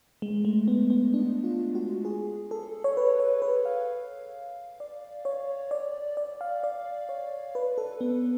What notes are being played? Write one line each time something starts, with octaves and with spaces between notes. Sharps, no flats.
G#3
A3
B3
B3
D4
F4
F#4
G#4
A4
C#5
B4
C#5
B4
F5
D5
C#5
D5
D5
F5
D5
C#5
B4
A4
B3